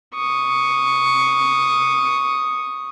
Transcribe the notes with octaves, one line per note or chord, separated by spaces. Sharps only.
C#6 D#6